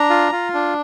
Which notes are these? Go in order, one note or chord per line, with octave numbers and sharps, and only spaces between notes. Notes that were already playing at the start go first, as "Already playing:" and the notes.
Already playing: D4 A#5
F4
F4
D4